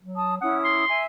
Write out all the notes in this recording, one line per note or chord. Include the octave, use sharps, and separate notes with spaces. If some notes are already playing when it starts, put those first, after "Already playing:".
F#3
A5 D#6
C#4 E4 F#5 D#6
C6
E5 G#5